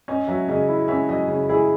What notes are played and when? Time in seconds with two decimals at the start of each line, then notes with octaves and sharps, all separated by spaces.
0.08 C#4 D#5
0.28 F#3 E5
0.48 C#3 D#5
0.69 E4
0.88 C#4 E5
1.08 F#3 D#5
1.28 C#3
1.49 E4 G#4